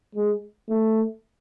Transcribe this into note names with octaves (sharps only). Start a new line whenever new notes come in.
G#3
A3